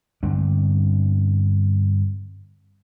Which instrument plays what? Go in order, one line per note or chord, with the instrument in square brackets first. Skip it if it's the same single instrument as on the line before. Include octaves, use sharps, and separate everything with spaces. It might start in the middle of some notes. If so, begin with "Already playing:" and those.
[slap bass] G2 D3 C4 D4